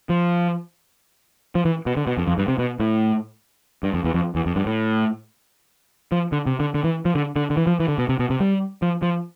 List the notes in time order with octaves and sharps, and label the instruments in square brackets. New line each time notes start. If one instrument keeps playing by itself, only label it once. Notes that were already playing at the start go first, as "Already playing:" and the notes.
[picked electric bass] F3
F3
E3
B2
D3
B2
F2
F2
G2
C3
B2
A2
G2
F2
E2
F2
E2
F2
G2
A2
F3
D3
C3
D3
D3
E3
F3
D3
D3
D3
E3
F3
E3
D3
B2
C3
B2
C3
G3
F3
F3